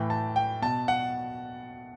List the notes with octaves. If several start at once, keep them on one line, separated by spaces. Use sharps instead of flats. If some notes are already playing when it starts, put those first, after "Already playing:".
Already playing: A2 E3 G5
A5
G5
B2 A5
F#5